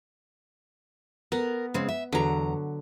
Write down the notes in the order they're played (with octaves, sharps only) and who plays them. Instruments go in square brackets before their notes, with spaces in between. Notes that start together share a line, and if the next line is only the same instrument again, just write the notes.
[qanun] B3 [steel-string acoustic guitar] A#4
[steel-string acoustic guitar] C#3 G#3 C4
E5
[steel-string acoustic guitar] E2 A#5 [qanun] D3 F#3